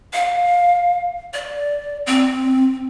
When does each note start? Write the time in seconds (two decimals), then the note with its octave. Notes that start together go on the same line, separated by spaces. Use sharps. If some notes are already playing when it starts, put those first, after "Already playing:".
0.13 F5
1.34 D5
2.06 C4